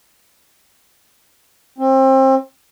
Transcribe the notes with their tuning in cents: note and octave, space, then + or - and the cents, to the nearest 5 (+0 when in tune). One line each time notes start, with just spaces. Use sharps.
C4 +30